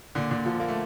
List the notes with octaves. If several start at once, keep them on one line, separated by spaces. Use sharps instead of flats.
A#2 D3
A#2 D3
D3 F3
A#3
A3